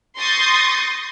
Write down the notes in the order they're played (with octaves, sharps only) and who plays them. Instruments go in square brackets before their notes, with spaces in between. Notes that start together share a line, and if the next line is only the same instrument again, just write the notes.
[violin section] C6 C#6 D#6 G6 A6 A#6